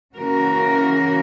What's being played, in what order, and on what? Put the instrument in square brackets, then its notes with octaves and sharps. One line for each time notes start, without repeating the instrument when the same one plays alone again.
[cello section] C#3 E3 A#3 C#4 F#4 A#4